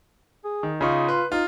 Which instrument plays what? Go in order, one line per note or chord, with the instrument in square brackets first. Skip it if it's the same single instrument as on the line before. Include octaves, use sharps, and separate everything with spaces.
[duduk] G#4
[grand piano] D#3
[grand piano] C#3 D#4 C#6 [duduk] F4
[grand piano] B4 C6
[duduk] D#4 [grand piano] F4